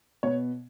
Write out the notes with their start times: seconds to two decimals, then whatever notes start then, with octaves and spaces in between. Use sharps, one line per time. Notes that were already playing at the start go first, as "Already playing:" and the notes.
0.23 B2 B3 C#5